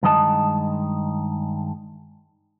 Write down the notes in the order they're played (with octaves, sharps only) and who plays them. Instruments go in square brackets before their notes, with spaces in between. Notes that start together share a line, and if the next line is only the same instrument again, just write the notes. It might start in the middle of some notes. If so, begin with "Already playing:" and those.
[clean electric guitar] G2 D#3 G#3 D#5 A5